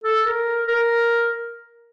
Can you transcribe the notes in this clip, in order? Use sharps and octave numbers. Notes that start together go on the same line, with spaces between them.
A4
A#4
A#4